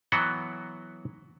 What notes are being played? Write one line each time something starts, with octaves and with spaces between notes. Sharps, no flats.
E3 F#3 B3 F#4 F#5 G5